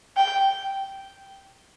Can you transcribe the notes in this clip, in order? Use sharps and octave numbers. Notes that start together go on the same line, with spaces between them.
G5